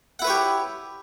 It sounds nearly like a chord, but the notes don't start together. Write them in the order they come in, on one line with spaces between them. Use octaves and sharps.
F#5 E4 B4 C#5 G4